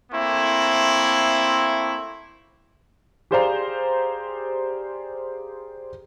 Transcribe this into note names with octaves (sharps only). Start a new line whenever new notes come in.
A3 A#3 C4 E4
G4 G#4 C5 D5 F5 A#5